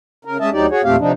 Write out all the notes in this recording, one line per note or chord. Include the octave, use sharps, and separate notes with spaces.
C#3 A#4
G#3 C#4 D#5 E5 A5
D2 F#3 D#4 G4 D5
F#4 G#4 C#5
E2 A#2 A3 C4 G4 F5
C3 F3 D4 D#4